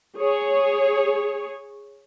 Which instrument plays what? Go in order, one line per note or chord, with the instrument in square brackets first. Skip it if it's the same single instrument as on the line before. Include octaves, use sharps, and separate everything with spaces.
[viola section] G#4 C#5